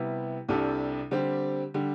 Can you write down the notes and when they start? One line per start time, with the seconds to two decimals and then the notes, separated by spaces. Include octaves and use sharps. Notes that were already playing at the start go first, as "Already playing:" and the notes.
Already playing: C3 G3 B3 E4
0.49 C2 C3 G3 D4 A4
1.11 D3 G3 C4 G4
1.74 D3 G3